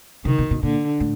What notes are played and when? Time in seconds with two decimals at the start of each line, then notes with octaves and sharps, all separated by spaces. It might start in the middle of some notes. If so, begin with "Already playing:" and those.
0.25 C3 D#3
0.38 B2
0.51 B2
0.62 A#2 D3
1.00 A2